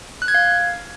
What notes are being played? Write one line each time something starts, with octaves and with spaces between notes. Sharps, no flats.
F#6
G#6
F5